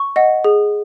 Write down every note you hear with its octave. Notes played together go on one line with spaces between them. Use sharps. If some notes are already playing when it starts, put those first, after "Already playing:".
Already playing: C#6
D#5 F#5
G#4